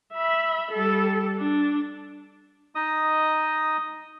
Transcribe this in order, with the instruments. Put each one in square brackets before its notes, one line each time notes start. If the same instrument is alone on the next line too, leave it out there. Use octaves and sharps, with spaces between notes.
[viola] E5 B5
G3 A4
D4
[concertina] D#4 D#5 D#6